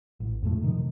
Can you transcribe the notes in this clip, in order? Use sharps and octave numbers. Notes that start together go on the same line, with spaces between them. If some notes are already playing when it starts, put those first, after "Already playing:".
A1
F2 A2 G#3 A3
C3 D#3 F3